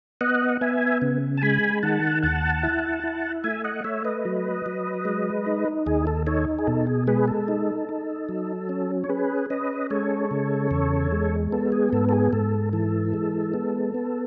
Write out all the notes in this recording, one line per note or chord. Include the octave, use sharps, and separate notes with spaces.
B3 D#5 F#5
B3 E5 G#5
C#3
A5
G#3 G#5 B5
D#3 F#5 A5
D#2 F#5 A5
E4
E4
A3 E5 G#5
D#5 F#5
A3 C#5 E5
B4 D#5
F#3
F#3
G#3
D#4
D#2 G#4
A4
D#4 A4 C#5
G#4
B2 A4
G#4
G#3 G#4 B4
A4
D#4
D#4
F#3
C#4
C#5
C#4 G#4 B4
C#4 B4 D#5
G#3 A4 C#5
C#3
E2
G#3
B3 A4
G#4
G#2 A4
A4
G#4
G#2 A4
E3 A4
G#3
B3
B3